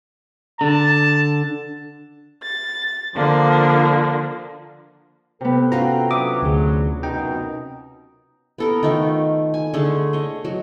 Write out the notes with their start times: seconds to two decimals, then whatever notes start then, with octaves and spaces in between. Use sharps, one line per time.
0.61 D3 A5
2.41 A6
3.15 D3 F3 A#3 D4
5.41 C3 B3 A4 G5
5.72 C#4 F4 F#4 A#5
6.11 F#3 D4 B4 E5 D6 D#6
6.42 D2 G#4
7.03 F#2 B2 D#4 G5
8.58 B3 A4 A#4
8.83 D#3 A3 F4
9.54 G#5
9.74 D3 A3 G#4 A5
10.13 C#5 D#5
10.45 F#3